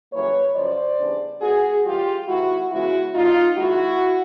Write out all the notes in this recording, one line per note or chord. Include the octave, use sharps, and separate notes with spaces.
F#2 C#3 E3 G3 A#3 B4 C#5
F#2 C#3 F3 C5 D5
C#3 E3 G3 B3 D4
D#3 G#3 B3 F#4 G#4
A2 E3 G3 F4 G4
C3 D#3 G#3 E4 F#4
C#3 E3 G#3 B3 E4 F#4
A#2 F3 A#3 D4 D#4 F4
F#2 D#3 G#3 E4 F#4